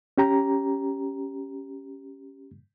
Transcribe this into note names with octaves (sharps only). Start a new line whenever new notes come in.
C#4 G4 A#5